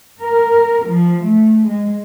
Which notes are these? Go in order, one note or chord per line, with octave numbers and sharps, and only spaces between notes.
A#4
F3
A3
G#3